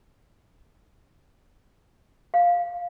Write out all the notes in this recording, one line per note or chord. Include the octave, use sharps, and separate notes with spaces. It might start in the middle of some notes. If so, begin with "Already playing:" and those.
F5